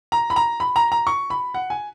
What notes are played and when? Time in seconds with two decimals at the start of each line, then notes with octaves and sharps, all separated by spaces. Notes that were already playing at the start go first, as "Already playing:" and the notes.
0.12 A#5
0.30 B5
0.36 A#5
0.60 B5
0.76 A#5
0.92 A#5
1.07 C#6
1.30 B5
1.54 F#5
1.70 G#5